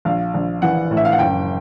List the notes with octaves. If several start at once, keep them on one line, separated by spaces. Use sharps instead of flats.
A#1 F5
A#1
E3 F#5
A2
E5
F5
F#5
F#1 G5